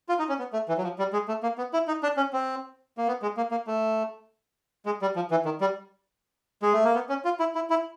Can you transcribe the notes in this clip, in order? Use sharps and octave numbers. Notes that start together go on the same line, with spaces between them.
F4
D#4
C#4
B3
A3
E3
F#3
F3
G3
G#3
A3
A#3
B3
E4
D#4
D4
C#4
C4
A#3
B3
G#3
A#3
A#3
A3
G#3
G3
F3
E3
D#3
G3
G#3
A3
A#3
B3
C#4
F4
E4
E4
E4